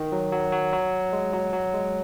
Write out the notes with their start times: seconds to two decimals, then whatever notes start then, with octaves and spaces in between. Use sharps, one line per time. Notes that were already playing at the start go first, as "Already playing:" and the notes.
Already playing: D#3
0.12 F#3
0.32 F#3
0.52 F#3
0.73 F#3
1.13 G#3
1.33 F#3
1.53 F#3
1.74 G#3